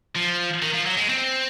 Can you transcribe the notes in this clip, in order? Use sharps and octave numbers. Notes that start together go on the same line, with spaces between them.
F3
D#3
F3
F#3
G#3
C4